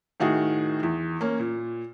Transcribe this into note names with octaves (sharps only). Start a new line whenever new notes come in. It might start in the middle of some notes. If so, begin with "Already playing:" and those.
A2 D#3 F#4 G#4
E2
A#3 C#4
A#2